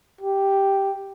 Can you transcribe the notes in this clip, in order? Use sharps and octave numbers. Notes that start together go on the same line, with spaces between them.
G4